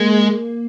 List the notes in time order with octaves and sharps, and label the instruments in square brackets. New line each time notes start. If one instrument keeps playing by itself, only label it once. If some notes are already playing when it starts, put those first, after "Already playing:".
Already playing: [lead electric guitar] G#3 [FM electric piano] A#3